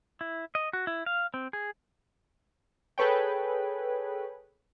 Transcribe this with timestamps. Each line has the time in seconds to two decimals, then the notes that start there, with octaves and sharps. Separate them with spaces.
0.21 E4
0.55 D#5
0.73 F#4
0.87 E4
1.06 F5
1.34 C4
1.53 G#4
2.98 G#4 A4 B4 C#5 G5